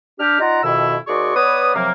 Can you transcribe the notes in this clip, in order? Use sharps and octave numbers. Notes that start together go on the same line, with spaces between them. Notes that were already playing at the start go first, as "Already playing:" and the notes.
D4 G4 F6
D#4 F4 D5 F#5 A#5
F2 B2 D#3 E4 E6
D#2 F#4 G#4 D5 C6 C#6
B3 B4 C#5 D5 D#6
C3 F3 F#3 A#3